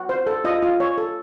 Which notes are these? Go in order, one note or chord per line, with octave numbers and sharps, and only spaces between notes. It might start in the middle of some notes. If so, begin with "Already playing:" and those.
Already playing: F#4
C5
A4
F4 D#5
F4
C#5
A4